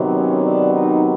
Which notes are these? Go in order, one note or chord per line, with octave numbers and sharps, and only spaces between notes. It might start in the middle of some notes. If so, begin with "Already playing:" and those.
Already playing: C3 D#3 F#3 B3
C#4
D4
D#4